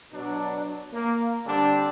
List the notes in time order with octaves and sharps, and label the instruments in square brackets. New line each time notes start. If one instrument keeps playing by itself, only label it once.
[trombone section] B2 F#3 D4
A#3
D3 G3 C4 D4